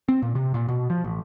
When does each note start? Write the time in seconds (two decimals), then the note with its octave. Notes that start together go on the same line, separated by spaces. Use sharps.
0.09 C4
0.22 A#2
0.35 C3
0.54 A#2
0.68 B2
0.90 F3
1.04 A1